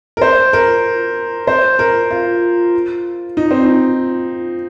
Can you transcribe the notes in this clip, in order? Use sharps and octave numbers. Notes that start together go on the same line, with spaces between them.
A#4
C5
A#4
C5
A#4
F4
D#4
C4
D#4